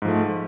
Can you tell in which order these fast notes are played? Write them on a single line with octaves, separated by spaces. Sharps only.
G#2 F3 A3